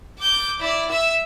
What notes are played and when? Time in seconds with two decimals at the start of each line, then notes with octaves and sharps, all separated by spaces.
0.18 D6 G6
0.60 E4 D5
0.91 E5 E6